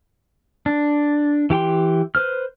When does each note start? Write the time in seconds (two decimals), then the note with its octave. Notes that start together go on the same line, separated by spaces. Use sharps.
0.66 D4
1.50 E3 G4 G5 C6
2.15 B4 C5 F6